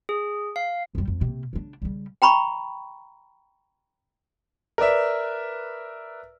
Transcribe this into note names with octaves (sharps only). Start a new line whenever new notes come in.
G#4
F5
F2 G3
F2
C3 A#3
C#3 D4
C#3 G3
G5 A#5 B5 C#6
A#4 B4 D5 E5